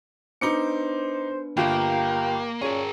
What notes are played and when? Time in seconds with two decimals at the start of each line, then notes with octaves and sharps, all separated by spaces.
0.41 B3 D4 D#4 B4 C5 D6 C#7
1.57 G1 A#3 F4 G4
2.62 A#2 C#4 G#4 A#4